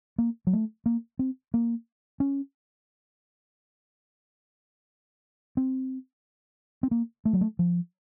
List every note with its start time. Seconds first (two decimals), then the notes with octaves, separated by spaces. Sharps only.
0.18 A#3
0.47 F#3
0.53 A3
0.86 A#3
1.19 C4
1.54 A#3
2.20 C#4
5.57 C4
6.83 C4
6.91 A#3
7.25 A3
7.33 F#3
7.41 A3
7.59 F3